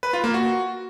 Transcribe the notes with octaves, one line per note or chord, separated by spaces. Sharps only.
B4
F4
A#3
F#4